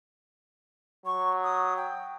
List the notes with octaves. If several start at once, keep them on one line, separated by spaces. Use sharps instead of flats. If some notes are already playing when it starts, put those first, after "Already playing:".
F#3 C#6
D#6
G5